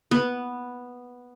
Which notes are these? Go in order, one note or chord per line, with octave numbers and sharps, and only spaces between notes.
B3